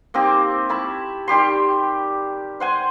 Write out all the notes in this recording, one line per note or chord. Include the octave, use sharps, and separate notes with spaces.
A#3 C4 D#4 G4
E4 A5 B5 C#6
D#3 G3 G4 C6
C5 F#5 G#5